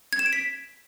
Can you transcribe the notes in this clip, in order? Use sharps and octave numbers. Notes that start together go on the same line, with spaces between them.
G#6
E7
D7
B6